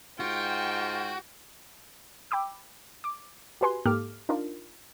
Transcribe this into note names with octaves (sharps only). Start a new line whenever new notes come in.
G#2 F4 F#4 G5
G5 B5 D6 E6
D6
F#4 G4 B4 G#5 C6
G#2 A#3 G4 A4 D6 F6
D4 D#4 F4 A#4